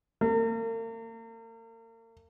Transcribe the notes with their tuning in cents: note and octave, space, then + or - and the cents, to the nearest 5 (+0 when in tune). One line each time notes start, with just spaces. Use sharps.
A#3 -40